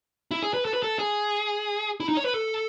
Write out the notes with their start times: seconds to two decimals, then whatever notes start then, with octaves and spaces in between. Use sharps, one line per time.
0.31 E4
0.43 G#4
0.54 B4
0.65 A4
0.74 B4
0.83 A4
0.99 G#4
2.00 E4
2.09 D#4
2.17 C#5
2.25 B4
2.34 A4